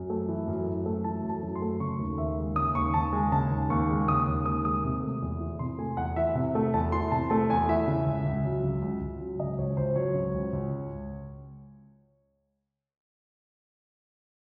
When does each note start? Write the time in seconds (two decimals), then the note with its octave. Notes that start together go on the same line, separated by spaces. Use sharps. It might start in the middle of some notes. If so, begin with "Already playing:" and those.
Already playing: F#2
0.10 A3
0.28 E3
0.47 F#2
0.67 F#2
0.86 A3
1.04 E3 A5
1.23 F#2
1.29 A5
1.42 F#2
1.55 C6
1.62 A3
1.80 C#3 C#6
1.99 D#2
2.18 D#2 E5
2.38 G#3
2.56 C#3 D#6
2.75 D#2 C#6
2.94 D#2 A5
3.13 G#3 G#5
3.32 C#3 A5
3.51 D#2
3.70 D#2 C#6
3.89 G#3
4.08 C#3 D#6
4.27 D#2
4.46 D#2 D#6
4.65 G#3 D#6
4.84 C3
5.03 A3
5.22 E2
5.40 E3
5.59 C3 C6
5.78 A3 G#5
5.97 E2 F#5
6.16 E3 E5
6.35 C3 E5
6.55 A3
6.74 E2 A5
6.92 E3 C6
7.12 C3 A5
7.30 A3 A5
7.49 E2 G#5
7.68 E3 E5
7.87 C#3
8.06 C#2
8.25 C#2
8.45 F#3
8.63 C#3
8.82 C#2
9.01 C#2
9.20 F#3
9.39 C#3 D#5
9.58 C#2 C#5
9.77 C#2 C5
9.96 F#3 C#5
10.15 C#3
10.33 C#2
10.53 C#2